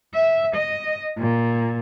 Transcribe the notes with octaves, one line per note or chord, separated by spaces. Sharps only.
E5
D#5
A#2